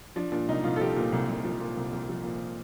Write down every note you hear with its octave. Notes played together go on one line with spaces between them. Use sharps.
F3 D4
A#2 D4
C2 D#4
C2 F4
A4
F3 G4
A#2
C2
C2
F3
A#2
C2
C2
F3
A#2